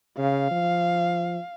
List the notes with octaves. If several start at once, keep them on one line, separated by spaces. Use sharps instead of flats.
C#3 F5
F3